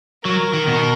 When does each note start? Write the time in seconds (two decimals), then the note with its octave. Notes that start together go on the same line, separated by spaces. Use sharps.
0.25 F#3 A#4
0.53 D#3
0.67 B2